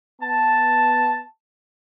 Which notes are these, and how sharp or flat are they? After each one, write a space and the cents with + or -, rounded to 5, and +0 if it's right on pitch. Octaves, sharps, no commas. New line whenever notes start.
B3 +0 A5 +0